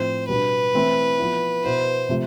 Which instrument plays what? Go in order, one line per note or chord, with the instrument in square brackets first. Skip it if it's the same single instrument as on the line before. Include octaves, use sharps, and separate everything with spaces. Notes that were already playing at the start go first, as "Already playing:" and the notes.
Already playing: [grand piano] A2 F3 C4 [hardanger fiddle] C5
[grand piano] B2 G3 B3 D4 [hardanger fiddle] B4
[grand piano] E3 A3 C4 E4
F3 B3 E4
[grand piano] B2 B3 E4 [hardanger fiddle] C5
[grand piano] C3 F3 A3